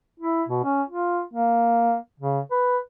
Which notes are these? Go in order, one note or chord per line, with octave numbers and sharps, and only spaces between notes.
E4
B2
C#4
F4
A#3
C#3
B4